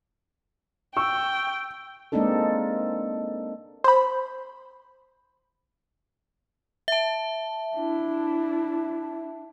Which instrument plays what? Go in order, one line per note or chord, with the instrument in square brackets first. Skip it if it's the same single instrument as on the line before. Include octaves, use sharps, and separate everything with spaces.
[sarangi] G5 [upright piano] C#6 E6
[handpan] G#3 A#3 C4 D4 D#4 A4
[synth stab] C5 B5
[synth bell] E5 A5
[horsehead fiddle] D4 E4